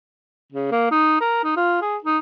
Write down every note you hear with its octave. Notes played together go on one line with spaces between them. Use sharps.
C#3
A#3
D#4
A#4
D#4
F4
G#4
D#4